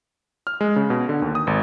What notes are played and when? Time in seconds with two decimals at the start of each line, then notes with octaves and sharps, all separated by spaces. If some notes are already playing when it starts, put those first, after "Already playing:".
0.47 F6
0.61 G#3
0.76 C#3
0.90 B2
1.09 D3
1.22 D#2
1.35 D#6
1.47 G#1